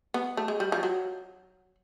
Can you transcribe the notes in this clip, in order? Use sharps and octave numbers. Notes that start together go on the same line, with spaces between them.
B3
A3
G#3
G3
F3
F#3